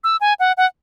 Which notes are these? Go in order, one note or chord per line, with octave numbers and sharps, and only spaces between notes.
E6
G#5
F#5
F#5